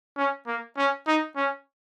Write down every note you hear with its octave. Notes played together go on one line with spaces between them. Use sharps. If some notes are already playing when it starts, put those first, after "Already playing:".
C#4
A#3
C#4
D#4
C#4